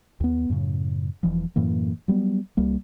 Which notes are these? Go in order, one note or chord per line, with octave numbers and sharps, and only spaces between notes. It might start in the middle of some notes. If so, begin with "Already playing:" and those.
D#2 B3
F#2 A2 C#3
E1 E3 F3
F#2 A2 E3 A#3
F#3 G3 B3
C2 G3 A#3